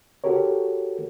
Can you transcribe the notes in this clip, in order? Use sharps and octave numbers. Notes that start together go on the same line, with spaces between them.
F#4 G4 A4 A#4 C#5